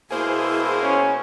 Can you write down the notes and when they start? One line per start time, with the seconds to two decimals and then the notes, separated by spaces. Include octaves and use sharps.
0.11 B2 G#3 A#3 E4 G#4 C5
0.83 C#4